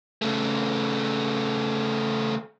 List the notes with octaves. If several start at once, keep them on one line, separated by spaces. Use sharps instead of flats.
C#3 A3